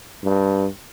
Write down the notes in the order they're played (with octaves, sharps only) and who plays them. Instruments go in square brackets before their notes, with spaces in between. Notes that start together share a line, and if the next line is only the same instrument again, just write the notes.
[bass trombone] G2